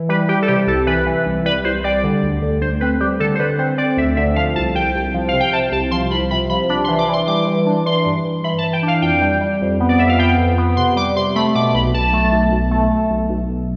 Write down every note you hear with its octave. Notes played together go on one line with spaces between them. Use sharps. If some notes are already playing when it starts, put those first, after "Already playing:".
Already playing: E3
G3 B4
G3 G4
A4
C3 G4
C2 A4
E3 B4
E3
C2
G3 B4
C2 C5
G3 D5
D3
D2
D3
D2 C5
C4 B4
G3 G4
D3 A4
C5
D3 B4
C4 C5
C4 D5
D2 E5
D3 E5
F3 F5
C2 A5
C2 G5
C2
F3
C3 F5
G5
C3 A5
C2 A5
F3 C6
C2 B5
C3 B5
F3 B5
D4 B5
C6
E3
D6
E3
C6
G3 D6
E3
D4
E3 C6
G2
E3
E3 B5
A5
E3
G5
D4
F5
F2 G5
G3
G3
F2
B3
D5
F2 E5
F5
B3 G5
F2
B3
C3 C6
G3 D6
C3 C6
A3 B5
B2 D6
B1 B5
B1 A5
A3
B1
B1
A3
A3
B1
B1
B1